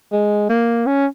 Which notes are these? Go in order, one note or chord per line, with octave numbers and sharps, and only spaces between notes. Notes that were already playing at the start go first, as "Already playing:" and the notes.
G#3
A#3
C#4